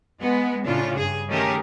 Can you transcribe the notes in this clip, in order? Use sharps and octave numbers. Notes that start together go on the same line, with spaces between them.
G#3 B3
A2 C#3 D4 F4
G2 G#4
D#3 A3 C#4 G4 G#4 A#4